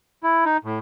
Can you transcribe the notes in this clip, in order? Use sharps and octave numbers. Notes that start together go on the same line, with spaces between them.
E4
D#4
A2